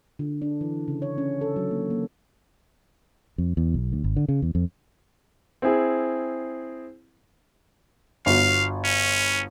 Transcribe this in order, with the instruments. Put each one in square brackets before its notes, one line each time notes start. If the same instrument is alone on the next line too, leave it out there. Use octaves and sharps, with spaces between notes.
[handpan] D3
D4
E3
C#3
C#5
C#4
A4
F#3
A#3
A#3
[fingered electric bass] F2
E2
B1
D2
G#1
D3
C#3
E2
F2
[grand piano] C4 E4 G#4
[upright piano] G1 F#4 [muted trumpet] F5
[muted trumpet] C#4